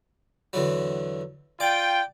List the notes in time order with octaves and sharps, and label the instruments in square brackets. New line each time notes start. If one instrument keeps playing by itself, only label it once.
[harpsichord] E2 D3 F#3
[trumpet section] F4 G5 [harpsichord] D5